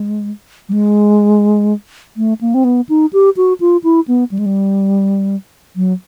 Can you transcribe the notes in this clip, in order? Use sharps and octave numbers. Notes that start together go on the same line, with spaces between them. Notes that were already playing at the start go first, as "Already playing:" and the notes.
Already playing: G#3
G3
G#3
A3
A#3
C4
B3
D#4
G4
F#4
F4
E4
B3
G3
G#3
G3
F#3